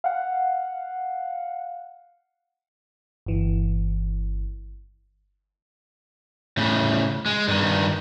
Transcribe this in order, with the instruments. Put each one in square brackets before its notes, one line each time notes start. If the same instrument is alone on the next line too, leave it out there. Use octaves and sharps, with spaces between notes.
[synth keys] F5 F#5
[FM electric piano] G1 E3
[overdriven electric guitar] A2 C#3
G#3
G2 D#3